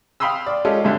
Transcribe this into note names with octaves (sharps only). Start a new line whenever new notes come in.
F5 G5 B5 C6 D#6 E6
D5
G#3 C#4 F4 G4 A4
D2 G2 D3